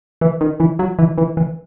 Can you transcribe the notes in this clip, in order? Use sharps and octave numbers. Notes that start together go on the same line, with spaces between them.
E3
D#3
E3
F#3
E3
E3
E3